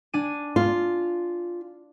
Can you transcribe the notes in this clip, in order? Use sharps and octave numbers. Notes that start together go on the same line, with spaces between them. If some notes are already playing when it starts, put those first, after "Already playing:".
D4 G#5 D#7
F4